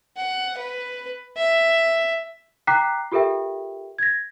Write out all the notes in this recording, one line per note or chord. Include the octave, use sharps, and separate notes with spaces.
F#5
B4
E5
G5 A#5 D6 F#6 B6 C7
F4 G4 A4 A#4 E5 G5
G#6 A#6